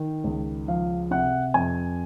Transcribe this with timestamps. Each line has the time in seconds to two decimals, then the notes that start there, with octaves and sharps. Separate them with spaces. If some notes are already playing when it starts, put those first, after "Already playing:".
Already playing: D#3
0.24 C#2
0.68 F3 F5
1.11 C3 F#5
1.54 F2 G#5